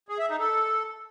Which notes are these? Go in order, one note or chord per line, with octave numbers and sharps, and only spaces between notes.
G#4
E5
D#4
A4